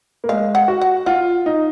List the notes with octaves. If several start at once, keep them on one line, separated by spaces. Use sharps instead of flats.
A#3
G#3 F5
F#5
F#4
F#5
F4 F#5
D#4